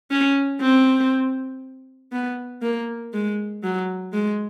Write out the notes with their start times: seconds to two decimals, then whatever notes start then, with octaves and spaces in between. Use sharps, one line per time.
0.11 C#4
0.62 C4
2.12 B3
2.62 A#3
3.13 G#3
3.63 F#3
4.13 G#3